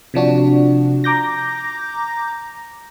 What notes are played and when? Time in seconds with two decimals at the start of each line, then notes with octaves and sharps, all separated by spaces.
0.14 C3 F3 D4 F#4
1.04 A#5 D6 G6 A#6